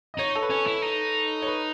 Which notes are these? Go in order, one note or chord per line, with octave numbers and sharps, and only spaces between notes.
D#5
D#4 C#5
A4
B4
C#4 C#5
E4
D#4
C#5
B4